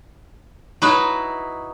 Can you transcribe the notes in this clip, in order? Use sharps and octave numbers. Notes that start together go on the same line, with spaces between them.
F#3 D#4 E4 B4